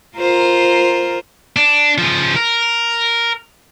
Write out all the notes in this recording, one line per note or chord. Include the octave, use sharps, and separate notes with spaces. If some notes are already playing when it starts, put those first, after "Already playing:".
F4 A#4 C5
D4
C#3 F3
A#4